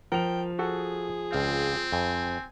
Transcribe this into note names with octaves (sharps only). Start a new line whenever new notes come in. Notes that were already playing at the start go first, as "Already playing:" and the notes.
F3 A#4 G5 F7
F#4 G#4 A4 F#5
C#2 C4 F5
F2 G#5